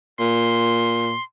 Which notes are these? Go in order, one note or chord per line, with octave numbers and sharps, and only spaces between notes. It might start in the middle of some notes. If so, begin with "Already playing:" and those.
A#2 C6